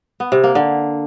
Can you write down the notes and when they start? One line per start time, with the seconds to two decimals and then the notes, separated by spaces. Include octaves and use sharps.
0.20 B3
0.32 C3
0.44 A#3
0.55 D3